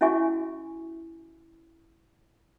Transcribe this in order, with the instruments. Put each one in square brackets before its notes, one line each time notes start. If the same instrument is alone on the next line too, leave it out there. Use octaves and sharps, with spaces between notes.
[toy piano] C#4 E4 F#4 E5 G#5 C#6